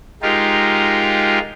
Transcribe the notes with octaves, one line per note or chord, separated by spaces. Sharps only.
G#3 D#4 F4 G4 A#4